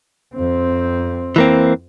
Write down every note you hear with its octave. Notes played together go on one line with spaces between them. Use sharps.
F2 C4
E3 A#3 C4